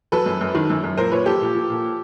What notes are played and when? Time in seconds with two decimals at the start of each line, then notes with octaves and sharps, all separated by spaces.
0.12 F#3 A4 B4
0.26 F#2
0.41 F#2
0.55 D#3
0.70 F#2
0.84 F#2
0.97 A#2 A#4 C5
1.12 A#2 B4 C#5
1.26 F3 G4 A4
1.41 A#2
1.55 F3
1.70 A#2